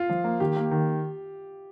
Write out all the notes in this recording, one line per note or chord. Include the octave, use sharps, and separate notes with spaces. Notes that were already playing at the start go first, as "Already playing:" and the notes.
Already playing: F4
F3
A#3
D#3 G4
A#3
D#3